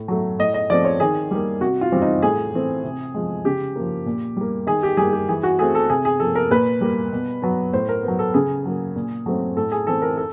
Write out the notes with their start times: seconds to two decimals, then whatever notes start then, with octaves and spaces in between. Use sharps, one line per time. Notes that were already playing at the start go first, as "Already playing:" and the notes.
Already playing: A2
0.08 F#3 A3
0.39 A2 D#5
0.54 D#5
0.70 F3 A3 C4 D5
0.85 C#5
1.00 D#3 G#4
1.31 G3 A#3
1.61 C3 F#4
1.81 F4
1.92 E3 G3 C4
2.02 D#4
2.23 A2 G#4
2.54 E3 A3 C4
2.84 C3
3.14 F3 G#3
3.45 C#3 G4
3.76 F3 A#3
4.06 A#2
4.37 G3 A#3
4.67 D#3 G#4
4.83 G4
4.97 G3 A#3 G#4
5.13 G4
5.29 E3 G#4
5.43 F#4
5.59 A3 C4 G#4
5.75 A4
5.90 C3 G#4
6.05 G#4
6.20 F3 A#3 A4
6.35 A#4
6.51 A#2 B4
6.81 G3 A#3
7.12 B2
7.42 F#3 B3
7.73 A2 C5
7.89 A#4
8.03 F#3 B3
8.19 A4
8.34 C#3 G#4
8.65 F#3 A#3
8.95 A#2
9.26 F#3 A3 C4
9.57 A2 A4
9.72 G#4
9.87 E3 A3 C4 A4
10.02 A#4
10.17 A4